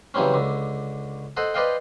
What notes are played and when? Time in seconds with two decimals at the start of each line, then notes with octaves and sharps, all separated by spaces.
0.14 C#3 E3 F#3 G3 C4 C#4
0.34 C#2 D3
1.37 A4 C5 D#5 F#5
1.54 B4 C5 D5 D#5 F5 G5